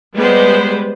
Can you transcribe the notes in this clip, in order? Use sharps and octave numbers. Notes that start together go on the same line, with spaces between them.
G3 G#3 B3 G4 B4 C5